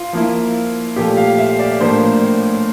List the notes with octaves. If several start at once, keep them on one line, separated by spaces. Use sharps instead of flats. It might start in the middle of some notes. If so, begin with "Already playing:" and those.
Already playing: F4
F3 A#3 E4
A#2 F3 A3 G4
F5
E5
D5
A2 F3 A#3 D4 C5